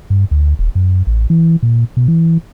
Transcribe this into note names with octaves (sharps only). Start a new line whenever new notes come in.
G2
D2
D#1
F#2
A1
E3
A#2
B2
E3